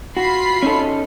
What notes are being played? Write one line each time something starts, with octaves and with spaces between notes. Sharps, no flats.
F4 F#4 B5 C7
C#4 D#4 A4